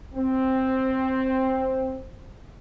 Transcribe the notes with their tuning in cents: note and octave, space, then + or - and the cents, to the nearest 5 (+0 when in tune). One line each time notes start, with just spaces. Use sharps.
C4 +5